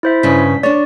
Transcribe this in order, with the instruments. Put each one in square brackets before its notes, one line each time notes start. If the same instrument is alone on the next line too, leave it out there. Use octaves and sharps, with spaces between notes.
[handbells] E4 C5 E5
[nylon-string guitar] G2 C#3 [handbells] B6
[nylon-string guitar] D4 C#5 [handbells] D5